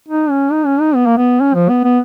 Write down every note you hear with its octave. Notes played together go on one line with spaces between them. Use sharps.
D#4
C#4
D#4
C#4
D#4
B3
A#3
B3
C#4
F3
B3
B3